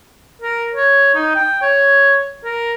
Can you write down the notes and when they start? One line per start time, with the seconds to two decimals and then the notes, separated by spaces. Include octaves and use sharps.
0.42 A#4
0.74 C#5
1.15 D#4
1.35 G5
1.62 C#5
2.44 A#4